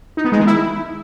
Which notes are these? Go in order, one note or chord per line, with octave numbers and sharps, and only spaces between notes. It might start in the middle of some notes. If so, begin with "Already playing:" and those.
D#4
B3
G#3
D#3
E4